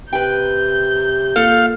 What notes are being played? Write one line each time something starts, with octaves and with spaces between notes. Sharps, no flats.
C3 B4 G5 G6
A#2 A4 F5